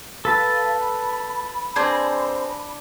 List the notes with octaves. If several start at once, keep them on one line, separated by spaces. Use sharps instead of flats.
A4 B4 F5 A5
B5
C4 D4 G#4 C5